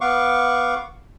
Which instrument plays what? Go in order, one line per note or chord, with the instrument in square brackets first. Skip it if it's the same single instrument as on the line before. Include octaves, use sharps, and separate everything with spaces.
[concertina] B3 F5 F#5 C#6 D6